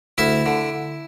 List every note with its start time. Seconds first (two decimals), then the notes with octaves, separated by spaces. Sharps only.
0.18 D2 E4 E5
0.46 D3